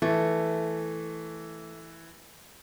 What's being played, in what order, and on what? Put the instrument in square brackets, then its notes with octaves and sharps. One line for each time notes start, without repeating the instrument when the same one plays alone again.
[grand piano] E3 [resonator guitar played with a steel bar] A3